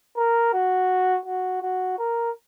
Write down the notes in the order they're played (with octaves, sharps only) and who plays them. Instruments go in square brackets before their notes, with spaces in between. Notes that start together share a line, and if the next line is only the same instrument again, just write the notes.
[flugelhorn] A#4
F#4
F#4
F#4
A#4